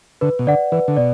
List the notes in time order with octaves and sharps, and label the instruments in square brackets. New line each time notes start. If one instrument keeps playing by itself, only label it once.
[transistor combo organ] D3 [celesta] B4
[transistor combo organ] B2
[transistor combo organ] D3 [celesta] D5 F#5
[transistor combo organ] E3 [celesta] B4
[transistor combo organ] D3
[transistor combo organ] B2 [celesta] D5